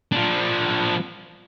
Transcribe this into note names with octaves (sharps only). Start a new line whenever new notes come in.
F3 D4